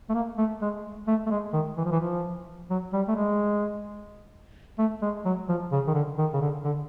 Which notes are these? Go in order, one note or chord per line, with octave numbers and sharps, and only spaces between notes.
A3
A#3
A3
G#3
A3
A3
G#3
D#3
E3
F3
E3
F3
F#3
G3
A3
G#3
A3
G#3
F#3
F3
C#3
D#3
D3
D#3
C#3
D3
D3